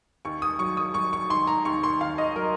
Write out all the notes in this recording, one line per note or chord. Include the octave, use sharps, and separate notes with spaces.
D#2 C#6
D#6
F#3 C#6
D#6
F#3 C#6
C#6
D#3 C6
A#5
D#2 C#6
C6
D#2 F5
D#5
F#3 A#4